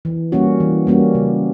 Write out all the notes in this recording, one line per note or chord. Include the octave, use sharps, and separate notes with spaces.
E3
G3 A#3 C#4 F#4
E3
G3 A#3 C#4 F#4
C#3